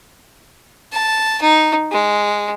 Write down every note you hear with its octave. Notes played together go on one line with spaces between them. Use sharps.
A5
D#4
G#3